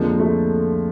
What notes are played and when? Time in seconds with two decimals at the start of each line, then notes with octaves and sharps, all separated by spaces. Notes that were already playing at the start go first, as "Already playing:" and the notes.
Already playing: F2 D3 F3 G#3 A#3
0.12 G#3
0.20 A3